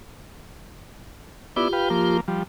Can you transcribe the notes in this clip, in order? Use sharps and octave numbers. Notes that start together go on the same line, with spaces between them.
B3 E4 F4 G4 D5
B4 F5 G5
F3 A#3
F3 G3